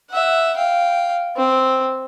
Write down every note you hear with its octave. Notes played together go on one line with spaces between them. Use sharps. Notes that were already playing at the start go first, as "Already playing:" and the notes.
E5 F#5
F5 G5
C4